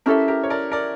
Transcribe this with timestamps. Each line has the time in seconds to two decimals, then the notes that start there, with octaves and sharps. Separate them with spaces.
0.06 C#4 E4 G4 A4 A#4 E5
0.28 G4 A#4
0.44 C#5
0.50 A#4 D5
0.72 A#4 D5